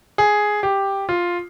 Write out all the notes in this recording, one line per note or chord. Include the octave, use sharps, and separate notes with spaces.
G#4
G4
F4